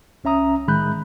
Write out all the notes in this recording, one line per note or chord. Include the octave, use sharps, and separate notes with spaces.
C2 C#4 E5 A#5 D#6
A2 D#3 G#3 B5 F#6 G6